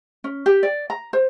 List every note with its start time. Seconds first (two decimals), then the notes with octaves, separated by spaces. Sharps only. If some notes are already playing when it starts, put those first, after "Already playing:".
0.24 C#4
0.46 G4
0.63 D5
0.90 A#5
1.13 C5